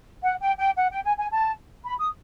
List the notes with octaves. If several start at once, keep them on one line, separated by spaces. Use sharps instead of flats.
F#5
G5
G5
F#5
G5
G#5
G#5
A5
B5
D#6